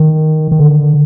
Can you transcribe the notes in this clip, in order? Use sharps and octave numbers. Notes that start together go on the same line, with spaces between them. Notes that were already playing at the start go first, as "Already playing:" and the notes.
Already playing: D#3
D#3
D3